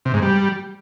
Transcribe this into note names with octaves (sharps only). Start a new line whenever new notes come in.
C3
G#2
G3